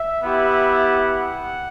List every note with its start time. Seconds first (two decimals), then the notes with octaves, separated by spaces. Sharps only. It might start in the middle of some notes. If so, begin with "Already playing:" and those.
Already playing: E5
0.23 B3 E4 G4
0.89 F#5